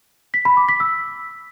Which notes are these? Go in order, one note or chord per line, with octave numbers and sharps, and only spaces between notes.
B6
B5
D6
B6
E6